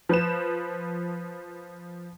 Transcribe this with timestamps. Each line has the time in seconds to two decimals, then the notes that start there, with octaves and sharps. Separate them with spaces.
0.09 F3 B4 E7